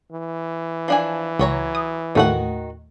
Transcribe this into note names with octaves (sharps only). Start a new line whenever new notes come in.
E3
F3 D4 G#5
C#2 F#3 C#5 A#5
D#6
D#2 A2 D#3 A3 F#4 F#5